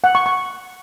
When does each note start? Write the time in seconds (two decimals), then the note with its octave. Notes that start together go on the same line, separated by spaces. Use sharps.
0.04 F#5
0.15 C#6
0.26 C#6